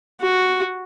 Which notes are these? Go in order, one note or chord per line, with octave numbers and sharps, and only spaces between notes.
F#4